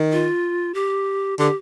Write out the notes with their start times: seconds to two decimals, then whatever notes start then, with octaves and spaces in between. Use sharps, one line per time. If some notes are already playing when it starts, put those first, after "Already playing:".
Already playing: D#3
0.12 F4
0.74 G4
1.38 D3 G4